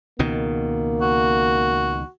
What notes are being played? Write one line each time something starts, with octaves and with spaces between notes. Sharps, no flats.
C#2 B2 D#3 A#3
F#4